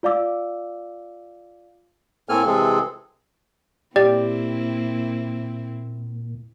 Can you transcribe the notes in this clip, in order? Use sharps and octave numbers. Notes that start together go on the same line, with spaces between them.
F4 D5 F5 D6 E6
A2 A#3 C4 A4 G#5 F6
C3 E3 G#3 C4 G#4 A4
A#2 A#3 C4 E4 G4 D5